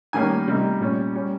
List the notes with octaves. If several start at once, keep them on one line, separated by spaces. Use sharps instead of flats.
D#3 G3 A#3 C#4 G#5
C3 G3 A#3 D#4
A#2 G3 C#4
G3 C#4